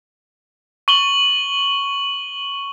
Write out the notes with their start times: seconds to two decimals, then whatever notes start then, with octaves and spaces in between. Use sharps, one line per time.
0.88 C#6 F#7 G7